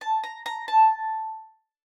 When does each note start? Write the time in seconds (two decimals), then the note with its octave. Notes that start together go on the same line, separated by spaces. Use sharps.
0.01 A5
0.24 A#5
0.46 A#5
0.68 A5